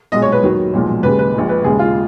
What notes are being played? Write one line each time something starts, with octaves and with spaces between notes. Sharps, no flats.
B1 A#2 G#3 D#5
C#5
B4
D#2 D#3 F#3
B1 A#2 F3 G#3
D#2 C#3 G#3 B4
B4
A#1 A#2 G#3
B4
D#2 C#3 G#3 G#4
F4